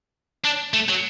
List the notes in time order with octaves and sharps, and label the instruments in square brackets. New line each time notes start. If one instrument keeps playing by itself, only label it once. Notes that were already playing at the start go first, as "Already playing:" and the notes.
[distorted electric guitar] D4
A3
F#3